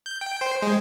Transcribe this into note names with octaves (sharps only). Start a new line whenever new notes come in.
G6
G5
C5
G#3